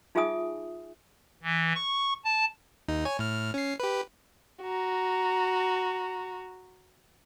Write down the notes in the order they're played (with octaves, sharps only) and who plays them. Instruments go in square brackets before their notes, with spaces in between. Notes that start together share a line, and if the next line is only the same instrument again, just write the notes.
[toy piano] D#4 F4 G#4 E5 G#5 D#6
[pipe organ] E3
C#6
A5
[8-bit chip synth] D#2 D#4
C#5 G#5
A2 F6
C#4 C7
G4 B4
[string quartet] F#4 A#5